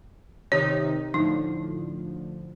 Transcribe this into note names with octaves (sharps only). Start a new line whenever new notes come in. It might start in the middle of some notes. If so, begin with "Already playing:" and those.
C3 D#3 D#4 C#5
A2 D3 F3 D#4